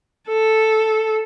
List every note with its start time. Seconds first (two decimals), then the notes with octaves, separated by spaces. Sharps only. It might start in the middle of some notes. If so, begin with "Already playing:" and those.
0.28 A4